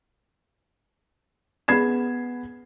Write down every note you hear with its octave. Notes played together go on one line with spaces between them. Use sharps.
B3 G#4 B5 G#6 C7 E7